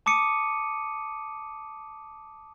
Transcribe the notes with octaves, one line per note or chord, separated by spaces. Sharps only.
A5 D6 D#6 C#7 D#7